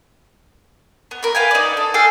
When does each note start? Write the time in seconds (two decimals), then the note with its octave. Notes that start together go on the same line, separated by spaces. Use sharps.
1.11 B3
1.23 A#4 B5
1.35 B4 F5 G5 G#5
1.51 D#4 D5
1.77 A4
1.94 G#4 A4 F5 G5